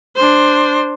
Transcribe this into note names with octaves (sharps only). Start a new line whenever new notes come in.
D4 C5